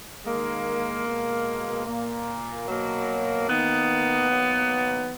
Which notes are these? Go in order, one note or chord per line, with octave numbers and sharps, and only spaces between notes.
D#3 G#3 A#3
B2 G#3
A#2 A#3
B2 F#3 A#3
D#3 A#3 B3
D#3 F#3 A#3